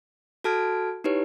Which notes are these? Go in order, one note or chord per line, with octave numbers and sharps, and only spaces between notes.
F#4 A4 A5 F6 G#6 D7
D#4 E4 G4 B4 C#5